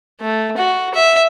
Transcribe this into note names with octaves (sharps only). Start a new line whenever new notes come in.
A3
F#4
E5